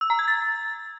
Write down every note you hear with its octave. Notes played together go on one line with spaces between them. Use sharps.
E6
A#5
G#6
A6